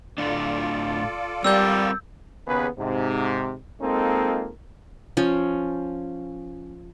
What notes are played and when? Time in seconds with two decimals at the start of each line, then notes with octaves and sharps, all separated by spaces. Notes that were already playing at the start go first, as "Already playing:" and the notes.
0.18 A2 A3 D4 F4 A4 D5
1.44 G3 C4 A#4 E6 G6
2.47 D#2 C#3 B3 G#4 B4
2.78 G#2 C3
3.81 G#3 A#3 C4 D#4 F4 A4
5.17 F3 C#4